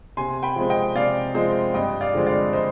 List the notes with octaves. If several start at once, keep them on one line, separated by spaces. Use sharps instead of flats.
C3 G#5 C6
G5 B5
F3 G#3 C4
D#5 G5
C3 D5 F5
F3 G#3 C4 C5 D#5
G2 D#5 G5
D5 F5
D3 F3 G#3 C4
D5 F5
C5 D#5